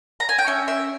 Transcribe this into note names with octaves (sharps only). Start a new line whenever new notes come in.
A#5
G#5
G5
C#4 E5
E5